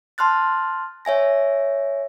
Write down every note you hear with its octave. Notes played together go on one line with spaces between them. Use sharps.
A5 C6 F6 F#6 A6
C#5 E5 G#5 A#6